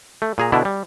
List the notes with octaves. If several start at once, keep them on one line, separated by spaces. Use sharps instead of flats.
A3
A#2 G#4 A#5
B2 D3 D4 E4
G3